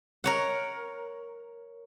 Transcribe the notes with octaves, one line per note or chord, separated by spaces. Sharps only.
A#4 C#5 F#5